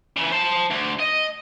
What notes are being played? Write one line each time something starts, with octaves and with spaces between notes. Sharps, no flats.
C#3 E3
C5 A5
D2
D#5